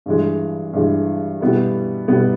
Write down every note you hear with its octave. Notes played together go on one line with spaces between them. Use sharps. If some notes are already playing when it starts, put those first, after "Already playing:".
G2 E3 G#3
G2 E3 G#3
B2 G3 B3 E4
B2 G3 B3 E4